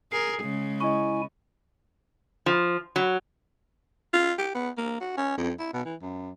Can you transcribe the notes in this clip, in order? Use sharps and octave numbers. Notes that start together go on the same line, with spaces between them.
G#4 A#4 C7
C#3 G#3
E4 D#5 G#5 C#6
F3
F#3
F4
G4
B3
A#3
F#4
C#4
F2
E4
B2
E3
F#2